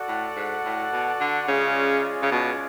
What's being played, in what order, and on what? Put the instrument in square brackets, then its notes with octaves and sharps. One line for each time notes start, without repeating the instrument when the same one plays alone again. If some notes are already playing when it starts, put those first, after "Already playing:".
Already playing: [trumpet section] F#4 A4 D5 F#5
[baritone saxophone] A2
G#2
A2
B2
D3
[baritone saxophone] C#3 [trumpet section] G#3 C#4 F4 G#4 D5
[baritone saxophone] C#3
B2